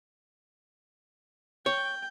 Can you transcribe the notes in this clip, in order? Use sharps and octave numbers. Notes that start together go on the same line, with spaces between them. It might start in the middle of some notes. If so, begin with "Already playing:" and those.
C#5 G5